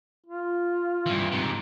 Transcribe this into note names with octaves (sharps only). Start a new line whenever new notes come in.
F4
G2 E3
G#2 C3